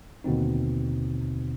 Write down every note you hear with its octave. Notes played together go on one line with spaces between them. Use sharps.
D#2 B2 D3 C4 D#4